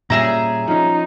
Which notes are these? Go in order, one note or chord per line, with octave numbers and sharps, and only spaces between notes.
A#2 G3 C#4 G#4 E5 A#5
F3 C#4 D#4